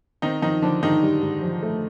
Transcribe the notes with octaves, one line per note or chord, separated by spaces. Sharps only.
D#3 C4 D#4
D#3 F3 D#4
D3 F3 D4
G#2 D#3 D#4
G3
G#2
F3
A3